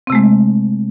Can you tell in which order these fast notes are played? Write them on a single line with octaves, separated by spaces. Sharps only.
C4 C3 A3 G#3